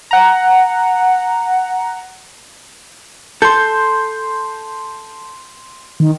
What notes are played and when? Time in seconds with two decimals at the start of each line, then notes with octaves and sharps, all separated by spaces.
0.11 F#5 A#5
3.42 A4 C6 G6
6.00 D#3